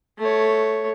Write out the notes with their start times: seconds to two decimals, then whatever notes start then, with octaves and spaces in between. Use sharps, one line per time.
0.19 A3 C#5